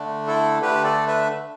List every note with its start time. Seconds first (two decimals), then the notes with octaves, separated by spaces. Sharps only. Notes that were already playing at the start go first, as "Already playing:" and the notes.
Already playing: D3 A3 D4
0.27 E4 A4
0.62 D3 A3 D4 G4 B4
0.84 A4 D5
1.07 B4 E5